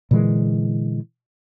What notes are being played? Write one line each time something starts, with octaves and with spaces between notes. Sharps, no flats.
A#2 D3 E3 G#3